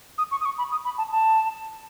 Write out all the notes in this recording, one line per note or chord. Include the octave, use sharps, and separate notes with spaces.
D#6
C#6
D#6
C#6
B5
D#6
B5
A5
A5